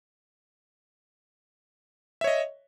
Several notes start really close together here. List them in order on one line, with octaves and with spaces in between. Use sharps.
E5 C#5 D#5